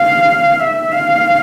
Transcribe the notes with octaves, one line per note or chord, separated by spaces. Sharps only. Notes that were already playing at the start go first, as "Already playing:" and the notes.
Already playing: F5
E5
F5